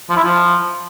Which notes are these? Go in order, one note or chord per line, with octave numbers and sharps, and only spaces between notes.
F3
E4
F3